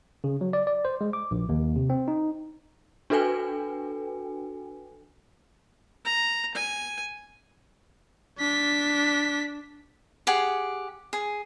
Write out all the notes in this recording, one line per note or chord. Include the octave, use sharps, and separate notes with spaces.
C#3
F#3
D5
D5
C5
G#3
D6
A#1
D#2
C3
C4
D#4
D4 F#4 A4 B4 G5 G#5
A#5
G#5
D4 B6
G4 G#4 F#5
G#4